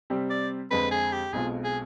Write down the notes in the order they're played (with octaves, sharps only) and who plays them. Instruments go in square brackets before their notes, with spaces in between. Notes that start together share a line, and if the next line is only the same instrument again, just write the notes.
[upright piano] C3 G3 C4 G4
[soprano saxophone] D5
[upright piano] F2 D3 G#3 C4 [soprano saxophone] B4
[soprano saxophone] G#4
G4
[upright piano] B1 B2 G#3 C4 F4 [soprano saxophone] G#4
[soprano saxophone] G#4